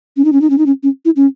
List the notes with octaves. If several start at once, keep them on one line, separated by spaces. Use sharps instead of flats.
C#4
D#4
C#4
D#4
C#4
D#4
C#4
C#4
E4
C#4